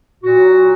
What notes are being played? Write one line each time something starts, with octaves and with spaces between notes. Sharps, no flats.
A#2 F#3 F#4